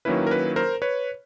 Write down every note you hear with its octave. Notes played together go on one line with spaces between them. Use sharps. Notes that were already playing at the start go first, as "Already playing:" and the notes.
D#3 F#3 A#3 C#4 E4 B4
A#4
B4
A#4 C5
B4 C#5